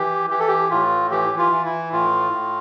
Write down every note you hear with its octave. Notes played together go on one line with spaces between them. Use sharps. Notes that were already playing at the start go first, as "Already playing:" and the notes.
Already playing: E3 G4
E3 G4
A4
G4
A2 F4
E3 G4
F4
E3
E4
A2 F4
A2